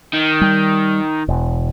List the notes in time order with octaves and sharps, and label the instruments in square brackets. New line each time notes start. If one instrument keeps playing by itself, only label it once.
[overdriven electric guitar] D#3
[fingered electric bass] G3
E1